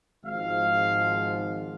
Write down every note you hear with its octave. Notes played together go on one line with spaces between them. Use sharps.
G#1 G#2 F3 F5